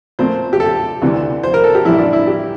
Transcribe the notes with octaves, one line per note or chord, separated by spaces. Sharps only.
A#2 A3 C4 C5
G4
A4
D2 C3 E3
C5
A#4
A4
G4
A1 A2 E3 G3 E4
D4
E4
G4